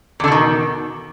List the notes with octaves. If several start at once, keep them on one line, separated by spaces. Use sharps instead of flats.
E2 B2 D3 D#3